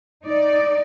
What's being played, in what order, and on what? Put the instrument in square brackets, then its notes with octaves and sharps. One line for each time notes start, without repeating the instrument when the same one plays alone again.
[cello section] D#4 D5